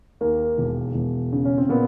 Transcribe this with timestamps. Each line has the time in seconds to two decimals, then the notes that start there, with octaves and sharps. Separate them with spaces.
0.21 D#2 A#3
0.58 E1
0.94 E1
1.33 C#3
1.45 C#4
1.58 C4
1.69 A#2 B3